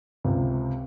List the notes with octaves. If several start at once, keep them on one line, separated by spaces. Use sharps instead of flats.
C#2 C3